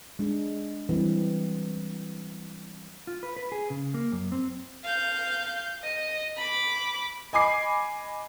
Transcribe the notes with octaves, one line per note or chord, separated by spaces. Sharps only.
G#3 D4
E3 G3 C4
F4
B4
B4
G#4
C#3
A#3
F#2
C4
F5 G6
D#5
B5 D6
D#5 G#5 B5 D6 C7